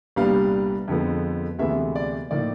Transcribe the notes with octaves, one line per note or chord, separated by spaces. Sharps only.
C2 A#2 G3 B3 D4 F5
F2 D3 F3 G#3 B3
D2 C3 E3 G#3 B3 E5
D5
A2 F3 A#3 D#4 D5